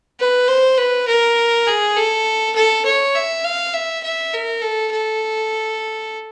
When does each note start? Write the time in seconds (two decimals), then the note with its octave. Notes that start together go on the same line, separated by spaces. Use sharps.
0.20 B4
0.48 C5
0.78 B4
1.07 A#4
1.68 G#4
1.97 A4
2.55 A4
2.85 C#5
3.15 E5
3.44 F5
3.73 E5
4.04 E5
4.33 A#4
4.62 A4
4.92 A4